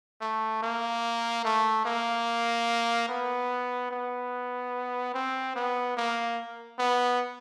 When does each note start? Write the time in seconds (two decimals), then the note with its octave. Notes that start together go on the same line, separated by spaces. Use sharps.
0.21 A3
0.62 A#3
1.44 A3
1.85 A#3
3.09 B3
3.90 B3
5.14 C4
5.56 B3
5.97 A#3
6.79 B3